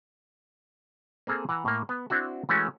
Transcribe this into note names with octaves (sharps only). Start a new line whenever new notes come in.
A#3 C4 G#4 A4
E3 F#5 A#5
A2 A#3
B3
C4 D4 E4 F#4
E3 G#3 A3 C#4 F#4